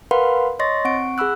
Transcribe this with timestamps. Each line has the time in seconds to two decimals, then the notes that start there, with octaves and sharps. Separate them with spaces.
0.11 A#4 B4 F5 F#5 B5 C6
0.59 C#5 D#5 C6 C#6 A6 A#6
0.85 C4 F#5 C#6 D7
1.18 G#4 F#5 B5 E6 F#6